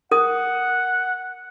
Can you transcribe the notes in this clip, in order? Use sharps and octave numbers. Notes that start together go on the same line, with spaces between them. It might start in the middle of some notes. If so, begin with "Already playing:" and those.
A#4 F#5 D#6